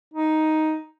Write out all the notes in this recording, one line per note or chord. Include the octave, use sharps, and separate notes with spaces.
D#4